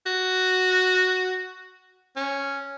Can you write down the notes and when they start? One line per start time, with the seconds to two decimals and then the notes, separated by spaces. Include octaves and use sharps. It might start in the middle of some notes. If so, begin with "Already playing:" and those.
0.06 F#4
2.16 C#4